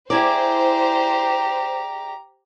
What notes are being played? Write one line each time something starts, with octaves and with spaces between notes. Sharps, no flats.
E4 G4 G#4 C5 D5 A#5